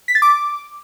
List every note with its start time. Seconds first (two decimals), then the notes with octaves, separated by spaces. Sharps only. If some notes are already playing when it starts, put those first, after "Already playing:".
0.08 B6
0.15 A6
0.22 D6